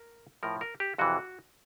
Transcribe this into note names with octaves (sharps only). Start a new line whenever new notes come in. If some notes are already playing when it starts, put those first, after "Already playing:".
Already playing: A#4
A2 F3 A#4
A#4
G4
F2 C3 E3 F#4